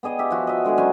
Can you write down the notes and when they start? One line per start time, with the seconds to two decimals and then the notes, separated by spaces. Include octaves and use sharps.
0.03 B3 G#4 D#5 G5
0.19 G4 E5
0.30 F3 F#4
0.47 D#5 E5
0.64 D3 G#3 F#4 G#4
0.78 F#3 C#4 C5 G#5